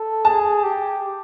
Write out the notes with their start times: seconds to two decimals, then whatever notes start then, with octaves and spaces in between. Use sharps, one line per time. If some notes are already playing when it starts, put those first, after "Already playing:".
Already playing: A4
0.24 G#4 A5
0.63 G4